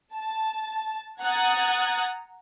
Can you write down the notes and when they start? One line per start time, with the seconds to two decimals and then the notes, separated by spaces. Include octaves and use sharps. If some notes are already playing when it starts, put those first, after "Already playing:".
0.15 A5
1.22 F#5 A#5 D#6 F#6 G#6 A6